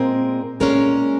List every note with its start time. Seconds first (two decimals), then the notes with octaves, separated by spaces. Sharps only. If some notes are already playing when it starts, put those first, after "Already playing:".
Already playing: A#2 G#3 C4 A#4
0.60 A#2 G#3 C#4 A#4